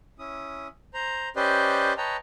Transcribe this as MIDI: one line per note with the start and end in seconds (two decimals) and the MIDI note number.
0.19 0.68 61
0.19 0.68 64
0.19 0.68 87
0.94 1.29 72
0.94 1.29 82
1.36 1.93 61
1.36 1.93 67
1.36 1.93 71
1.36 1.93 72
1.36 1.93 74
1.36 1.93 75
1.98 2.17 71
1.98 2.17 73
1.98 2.17 75
1.98 2.17 79
1.98 2.17 81
1.98 2.17 82